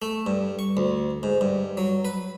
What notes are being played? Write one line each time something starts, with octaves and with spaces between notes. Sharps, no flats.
A3
G2
C#6
D2
G#2
G2
F#3
B4